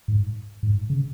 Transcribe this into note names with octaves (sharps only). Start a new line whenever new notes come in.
G#2
G#2
C#3